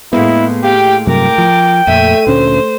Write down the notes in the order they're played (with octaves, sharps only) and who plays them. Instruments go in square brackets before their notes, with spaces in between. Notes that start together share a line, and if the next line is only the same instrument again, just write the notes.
[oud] A2 G#3 A#3 [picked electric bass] B3 [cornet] E4
[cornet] G4 [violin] F5 G5
[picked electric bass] G2 C3 F#3 [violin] A#4 D6 [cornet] G5
[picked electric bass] F3
[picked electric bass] F2 A#2 [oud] A3 [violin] E5 D#7
[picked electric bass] D2 A#2 C#4 [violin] C5